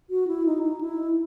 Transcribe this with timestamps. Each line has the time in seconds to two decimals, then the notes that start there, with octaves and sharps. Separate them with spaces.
0.10 F#4
0.27 E4
0.46 D#4
0.63 D#4
0.81 E4